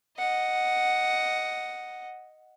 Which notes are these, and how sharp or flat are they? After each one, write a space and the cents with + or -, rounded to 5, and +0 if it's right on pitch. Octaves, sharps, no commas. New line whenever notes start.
D#5 +0 F#5 +0